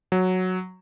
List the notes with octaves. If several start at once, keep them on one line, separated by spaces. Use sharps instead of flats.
F#3